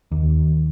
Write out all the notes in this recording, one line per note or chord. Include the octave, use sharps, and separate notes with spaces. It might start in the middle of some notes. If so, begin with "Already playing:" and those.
D#2